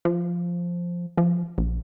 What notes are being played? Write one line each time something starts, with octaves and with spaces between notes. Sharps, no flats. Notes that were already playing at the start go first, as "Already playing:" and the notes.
F3
F3
A#1